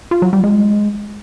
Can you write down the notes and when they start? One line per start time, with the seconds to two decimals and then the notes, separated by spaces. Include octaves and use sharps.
0.11 F4
0.22 F#3
0.33 G3
0.44 G#3